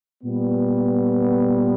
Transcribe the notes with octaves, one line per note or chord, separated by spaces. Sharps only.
A#2 G3 B3